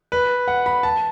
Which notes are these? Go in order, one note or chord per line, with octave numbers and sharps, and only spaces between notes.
B4
F#5
B5
A5